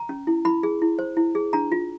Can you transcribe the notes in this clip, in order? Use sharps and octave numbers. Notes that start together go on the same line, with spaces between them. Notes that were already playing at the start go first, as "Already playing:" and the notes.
Already playing: A#5
C#4
E4
E4 B5
G#4
E4
C5
E4
G#4
D4 A#5
F4